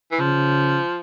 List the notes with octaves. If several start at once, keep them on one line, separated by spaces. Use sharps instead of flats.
E3
C#3 F3